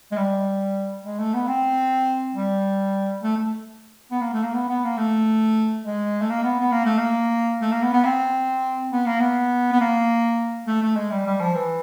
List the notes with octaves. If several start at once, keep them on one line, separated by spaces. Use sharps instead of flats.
G#3
G3
G#3
A3
B3
C4
G3
A3
A3
B3
A#3
A3
A#3
B3
B3
A#3
A3
G#3
A3
A#3
B3
B3
A#3
A3
A#3
A3
A#3
B3
B3
C4
B3
A#3
B3
B3
A#3
A3
A3
G#3
G3
G3
F3
E3